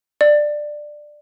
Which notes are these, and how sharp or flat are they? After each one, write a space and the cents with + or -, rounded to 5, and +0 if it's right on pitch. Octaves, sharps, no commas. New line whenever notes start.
D5 +15